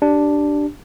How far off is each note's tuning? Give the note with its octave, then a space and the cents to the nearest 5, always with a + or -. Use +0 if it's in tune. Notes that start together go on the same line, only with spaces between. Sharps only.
D4 +0 G4 -10